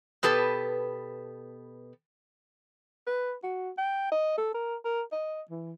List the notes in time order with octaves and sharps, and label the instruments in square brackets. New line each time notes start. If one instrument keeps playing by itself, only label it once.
[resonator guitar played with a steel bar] B2 B3 G4 A4 B4
[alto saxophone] B4
F#4
G5
D#5
A4
A#4
A#4
D#5
E3